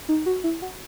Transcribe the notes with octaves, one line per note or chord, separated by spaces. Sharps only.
D#4
F#4
E4
F#4